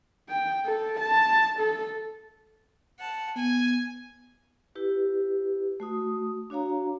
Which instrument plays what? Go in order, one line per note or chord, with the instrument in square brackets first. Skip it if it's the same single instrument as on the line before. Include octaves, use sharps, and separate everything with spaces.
[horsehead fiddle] G5
A4
A5
A4
[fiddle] F#5 A5
[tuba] B3 [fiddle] G#5
[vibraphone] E4 G4 B4
A3 F#4 D#6
D4 F#4 C#5 F5 A#5